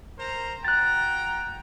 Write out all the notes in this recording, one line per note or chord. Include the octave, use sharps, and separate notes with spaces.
A#4 C5 A#5
F#4 G5 A#5 F#6 A6